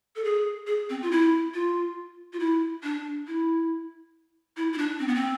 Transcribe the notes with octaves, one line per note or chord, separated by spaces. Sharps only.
A4
G#4
G#4
C4
F4
E4
F4
F4
E4
D4
E4
E4
E4
D4
C4
B3
C4